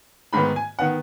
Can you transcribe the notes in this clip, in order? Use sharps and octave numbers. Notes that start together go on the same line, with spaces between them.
G#2 D#3 B3 B5
G#5
D#3 B3 F#5